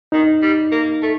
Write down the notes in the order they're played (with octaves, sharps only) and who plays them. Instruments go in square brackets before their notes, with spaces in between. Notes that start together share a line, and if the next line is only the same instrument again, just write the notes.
[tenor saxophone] D#3 [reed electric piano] D#4
[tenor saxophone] G3
A#3
A3